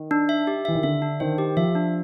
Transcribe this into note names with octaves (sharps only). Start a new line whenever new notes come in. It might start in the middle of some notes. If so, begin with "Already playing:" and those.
Already playing: D#3
D4
E5
G4
E3 E5
D#3
D3 E5
D4
D#3 C5
G4
F3 E5
D4